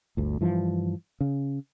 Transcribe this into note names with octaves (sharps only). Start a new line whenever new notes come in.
G1 D2
G2 E3 F3
C#3